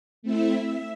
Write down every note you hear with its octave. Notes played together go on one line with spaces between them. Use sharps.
A3 C4 E4 E5
E5